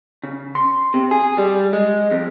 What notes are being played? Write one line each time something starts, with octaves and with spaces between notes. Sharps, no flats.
C#3
C6
C3
G#4
G3
G#3
F2